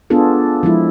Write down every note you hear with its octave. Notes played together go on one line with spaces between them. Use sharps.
B3 D4 F4 G#4 A4
F3 G#3 E4